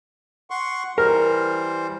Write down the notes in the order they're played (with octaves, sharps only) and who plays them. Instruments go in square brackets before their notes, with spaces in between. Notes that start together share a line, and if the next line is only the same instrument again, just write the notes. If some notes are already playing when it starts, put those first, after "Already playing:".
[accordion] F#5 C6 C#6
[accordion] E3 G3 C5 [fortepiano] A#4